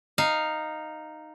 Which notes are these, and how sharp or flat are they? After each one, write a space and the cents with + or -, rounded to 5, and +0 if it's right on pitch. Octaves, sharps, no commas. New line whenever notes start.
D#4 -5 F5 +0